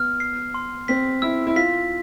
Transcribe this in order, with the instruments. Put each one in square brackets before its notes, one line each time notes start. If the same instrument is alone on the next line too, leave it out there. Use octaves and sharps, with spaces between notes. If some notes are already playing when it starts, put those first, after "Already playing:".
Already playing: [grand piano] B3 [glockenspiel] F6
[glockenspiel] C7
C6
[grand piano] C4 [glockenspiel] B6
[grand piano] E4 [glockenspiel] E6
[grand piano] E4
[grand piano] F4 [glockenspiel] B6